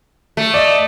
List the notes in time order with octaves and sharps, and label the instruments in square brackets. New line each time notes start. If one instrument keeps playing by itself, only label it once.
[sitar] A3
[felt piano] D5 D#5